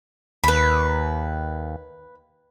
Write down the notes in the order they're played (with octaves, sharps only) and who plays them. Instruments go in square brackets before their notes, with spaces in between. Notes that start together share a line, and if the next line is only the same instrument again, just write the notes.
[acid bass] D#2 [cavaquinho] B4 B5